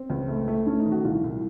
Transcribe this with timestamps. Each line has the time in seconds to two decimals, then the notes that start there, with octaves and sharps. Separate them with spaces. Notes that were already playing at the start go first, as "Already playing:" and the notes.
Already playing: C4
0.10 C#2
0.28 A3
0.48 A3
0.67 A3 C#4
0.79 D#4
0.86 D#3
0.92 F#4
1.05 C2 F4
1.24 C2